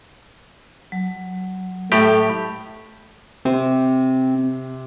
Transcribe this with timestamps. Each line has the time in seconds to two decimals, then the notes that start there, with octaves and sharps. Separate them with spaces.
0.92 F#3
1.92 A2 A3 G4
3.45 C3 C4 C5